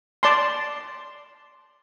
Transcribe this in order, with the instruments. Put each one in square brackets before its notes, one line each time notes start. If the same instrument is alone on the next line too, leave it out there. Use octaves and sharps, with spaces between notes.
[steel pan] D5 A5 C6